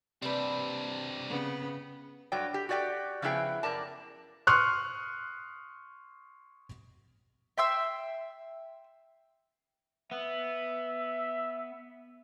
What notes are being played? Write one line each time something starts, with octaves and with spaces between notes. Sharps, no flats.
C3 G3 C4 D4 B4
C#3 B3
G2 F#3 D5 G5
G4
F#4 G4 D5 D#5 G5
C#3 F3 B3 E4 G#4 G5
F#2 A#4 D5 A5
C6 C#6 D#6 F6 F#6
E5 G5 C6 E6
B3 E5